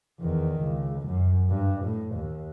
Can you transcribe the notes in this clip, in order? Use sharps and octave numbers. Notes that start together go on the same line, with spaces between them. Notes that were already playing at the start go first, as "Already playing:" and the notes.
E2 D#3
C#2
F#2
G2
A2
D#2